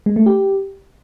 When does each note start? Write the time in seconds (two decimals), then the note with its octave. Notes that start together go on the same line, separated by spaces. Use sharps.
0.06 G#3
0.16 A3
0.26 G4